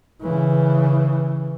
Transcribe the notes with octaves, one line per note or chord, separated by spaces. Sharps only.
C#3 E3